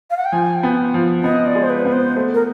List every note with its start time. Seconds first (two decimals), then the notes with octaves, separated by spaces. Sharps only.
0.10 F5
0.17 F#5
0.25 G5
0.32 F3 G#5
0.55 G5
0.63 B3
0.94 F3
1.23 B3 D#5
1.46 D5
1.55 G#3
1.63 C5
1.70 B4
1.85 B3
1.92 C5
2.16 A3
2.34 A#4